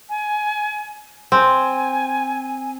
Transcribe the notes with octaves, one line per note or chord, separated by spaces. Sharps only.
G#5
C4 G#5